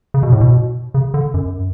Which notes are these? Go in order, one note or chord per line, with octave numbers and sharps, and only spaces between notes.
C#3
B2
A2
B2
C#3
D3
F#2